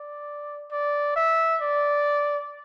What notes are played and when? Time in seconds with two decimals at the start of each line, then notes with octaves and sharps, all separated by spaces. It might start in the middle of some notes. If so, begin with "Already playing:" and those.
Already playing: D5
0.71 D5
1.16 E5
1.61 D5